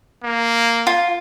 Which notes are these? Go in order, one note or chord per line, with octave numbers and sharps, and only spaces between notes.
A#3
F4